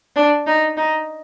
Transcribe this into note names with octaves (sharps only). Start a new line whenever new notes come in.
D4
D#4
D#4